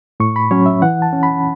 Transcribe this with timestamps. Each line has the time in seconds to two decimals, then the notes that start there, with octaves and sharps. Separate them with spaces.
0.20 A2 C#6
0.36 B5
0.51 F#3 C#4 C#5
0.66 E5
0.82 E3 F#5
1.02 A5
1.13 C#4
1.23 B5